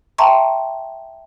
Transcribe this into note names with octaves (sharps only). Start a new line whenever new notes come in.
E5 G5 A5 A#5 C6 C#6